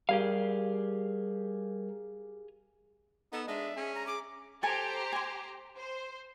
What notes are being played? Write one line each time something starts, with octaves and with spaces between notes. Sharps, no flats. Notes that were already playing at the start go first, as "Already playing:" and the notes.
G3 G4 G#4 A#4 F5
B3 D#4 A4
G#3 D4 E5
C#4 G#4
A#5
G#4 D6
G4 A4 C5 G#5 A#5
G#5 C6
C5